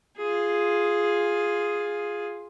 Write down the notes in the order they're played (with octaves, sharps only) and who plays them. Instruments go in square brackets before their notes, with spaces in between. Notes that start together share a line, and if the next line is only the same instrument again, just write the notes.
[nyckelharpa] F4 G#4